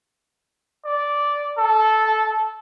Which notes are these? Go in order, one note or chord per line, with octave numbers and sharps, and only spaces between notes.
D5
A4